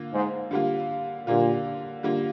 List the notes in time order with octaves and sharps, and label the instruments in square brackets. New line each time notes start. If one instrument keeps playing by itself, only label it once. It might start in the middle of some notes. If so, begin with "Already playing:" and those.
Already playing: [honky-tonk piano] D3 A#3 F4
[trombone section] G#2
[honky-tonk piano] D3 G3 A#3 F4
[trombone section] A#2 [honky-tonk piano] D3 G3 A#3 F4
[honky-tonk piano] D3 G3 A#3 F4